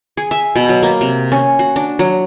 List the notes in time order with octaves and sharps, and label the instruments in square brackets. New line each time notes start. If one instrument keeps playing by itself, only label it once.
[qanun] G#4
E5
B2
F#3
A#3
C3
C#4
F#4
D4
F#3